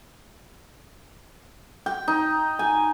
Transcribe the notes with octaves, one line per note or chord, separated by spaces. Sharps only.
G5
D#4
G#5